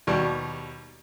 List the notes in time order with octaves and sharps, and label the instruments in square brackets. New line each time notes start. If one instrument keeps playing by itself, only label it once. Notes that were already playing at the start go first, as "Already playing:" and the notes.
[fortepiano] D#2 B2 G3